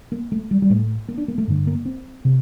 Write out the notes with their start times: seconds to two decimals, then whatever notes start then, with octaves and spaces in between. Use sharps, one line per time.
0.12 A#3
0.32 A3
0.51 G3
0.62 G3
0.70 A2 A3
1.09 A#3
1.18 D4
1.28 A#3
1.38 A3
1.48 G2 D3
1.67 A#3
1.85 C4
2.25 C3